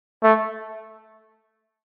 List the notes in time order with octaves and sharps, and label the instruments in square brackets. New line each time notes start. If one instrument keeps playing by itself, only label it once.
[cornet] A3